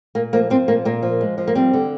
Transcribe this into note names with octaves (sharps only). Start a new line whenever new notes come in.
A#2 A#3
F3 A#3
F3 C4
A#2 A#3
A#2 A#3
F3
G#3
F3
A#3
G3 C4
D3